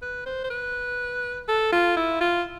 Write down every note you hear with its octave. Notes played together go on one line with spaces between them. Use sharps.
B4
C5
C5
B4
A4
F4
E4
F4